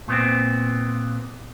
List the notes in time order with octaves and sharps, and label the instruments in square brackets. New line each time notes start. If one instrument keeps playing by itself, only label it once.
[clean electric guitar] A#2 B3 C4